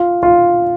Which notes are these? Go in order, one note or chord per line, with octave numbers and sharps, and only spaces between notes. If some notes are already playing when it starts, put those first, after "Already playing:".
Already playing: F4
F4